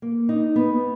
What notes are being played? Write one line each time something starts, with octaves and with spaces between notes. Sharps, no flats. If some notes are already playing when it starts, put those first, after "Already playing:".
A#3
D#4
B3